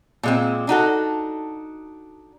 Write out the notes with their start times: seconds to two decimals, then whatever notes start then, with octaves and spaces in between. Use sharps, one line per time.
0.23 A#2 G#3 C4
0.67 D4 D#4 F#4 A4